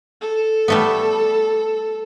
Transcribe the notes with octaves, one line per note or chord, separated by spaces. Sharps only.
A4
G3 A3 B3